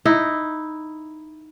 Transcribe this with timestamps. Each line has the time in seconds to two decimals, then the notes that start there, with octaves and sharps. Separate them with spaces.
0.05 D#4 E4